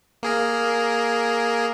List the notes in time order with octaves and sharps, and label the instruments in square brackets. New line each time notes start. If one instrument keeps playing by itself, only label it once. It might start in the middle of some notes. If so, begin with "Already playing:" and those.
[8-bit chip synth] A#3 G#4 A#4